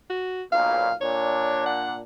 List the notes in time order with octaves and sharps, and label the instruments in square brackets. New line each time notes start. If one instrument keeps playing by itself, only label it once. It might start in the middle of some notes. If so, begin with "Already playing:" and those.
[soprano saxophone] F#4
[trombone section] B1 A#2 [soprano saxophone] F5
[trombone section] A#2 D4 [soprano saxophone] C#5
[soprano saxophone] F#5